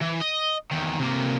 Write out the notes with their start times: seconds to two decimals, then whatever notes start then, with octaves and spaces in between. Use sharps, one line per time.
0.02 E3
0.22 D#5
0.71 E2 D#3
0.99 C3 A#3